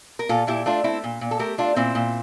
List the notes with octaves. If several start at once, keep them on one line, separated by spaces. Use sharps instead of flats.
A#4
A#2 F4 A4
A#2 E4 G4
A3 D4 F4
A3 C4 E4
A#2
A#2
A4
A3 G4 A#4
A3 D4 F4
A#2 C4 E4
A#2